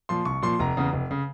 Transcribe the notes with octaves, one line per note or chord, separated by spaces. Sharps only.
A#2 F3 C6
C2 C#6
A#2 F3 C6
F1 A#5
E2 C#3
F1
C#3